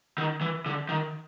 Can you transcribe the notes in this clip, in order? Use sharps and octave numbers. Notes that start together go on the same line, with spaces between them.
D#3
E3
D3
D#3